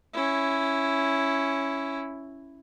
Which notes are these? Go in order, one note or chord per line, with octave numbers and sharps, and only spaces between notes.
C#4 E4